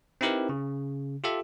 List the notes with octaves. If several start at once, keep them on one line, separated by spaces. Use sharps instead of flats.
C4 D#4 E4 G4 A#4 B4
C#3
F4 G4 A4 E5